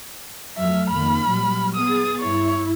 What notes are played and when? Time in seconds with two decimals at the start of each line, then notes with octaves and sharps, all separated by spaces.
0.58 F2 F#3 A3 E5 F6
0.90 F2 D#3 A#3 B5
1.27 A#2 F#3 G3
1.75 B3 G#4 D#6 A6
2.20 G2 E4 C#5